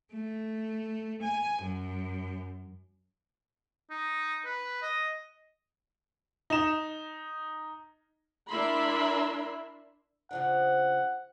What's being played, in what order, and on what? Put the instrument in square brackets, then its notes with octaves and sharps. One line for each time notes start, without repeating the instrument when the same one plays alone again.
[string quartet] A3
G#5
F#2
[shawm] D#4
B4
D#5
[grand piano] D#4 E7
[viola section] D4 E4 A#4 E5 B5 C6
[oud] C#3 F3 D4 [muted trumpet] F#5